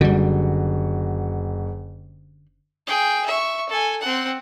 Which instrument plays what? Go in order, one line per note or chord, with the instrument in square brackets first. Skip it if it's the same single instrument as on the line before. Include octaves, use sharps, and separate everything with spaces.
[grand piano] F#1 F#4 [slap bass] D3 G3
[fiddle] G#4 G5
E5 C#6
A4 G#5
C4 F#5